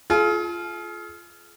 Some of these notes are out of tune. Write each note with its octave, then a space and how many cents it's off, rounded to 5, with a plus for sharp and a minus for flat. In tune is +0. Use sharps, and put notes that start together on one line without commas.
F4 -10 G#4 +45